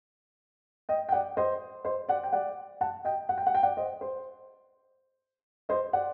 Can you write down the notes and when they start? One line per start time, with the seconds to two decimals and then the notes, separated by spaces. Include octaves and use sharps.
0.89 D#5 G5
1.09 G5
1.12 D5 F#5
1.37 C5 D#5
1.84 C5 D#5
2.09 D5 F#5
2.23 G5
2.33 D5 F#5
2.81 F#5 A5
3.05 D#5 G5
3.29 F#5
3.38 G5
3.47 F#5
3.55 G5
3.63 D5 F#5
3.77 C5 D#5
4.01 C5
5.69 C5 D#5
5.93 D5 F#5